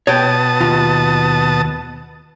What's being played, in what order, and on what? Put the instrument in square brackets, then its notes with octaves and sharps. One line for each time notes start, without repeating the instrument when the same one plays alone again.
[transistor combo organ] B2 A5 D#6 [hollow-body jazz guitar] C#5 G5
[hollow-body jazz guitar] D#2 F4